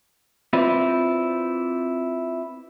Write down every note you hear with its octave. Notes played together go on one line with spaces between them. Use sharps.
C4 E4 F4 B4 C5 D5